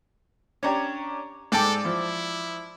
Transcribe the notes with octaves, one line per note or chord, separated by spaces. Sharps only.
C#4 D4 G4 C#5 A#5
G#2 A4 D5 G5 A5 D6
F3 E4